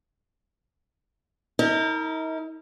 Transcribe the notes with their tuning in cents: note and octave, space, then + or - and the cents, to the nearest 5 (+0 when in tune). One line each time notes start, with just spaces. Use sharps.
D#4 +45 A#4 -25